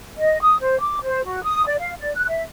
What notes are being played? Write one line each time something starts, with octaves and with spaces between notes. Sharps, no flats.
D#5
D#6
C5
D6
C5
F#4
D#6
D5
F5
D5
F#6
E5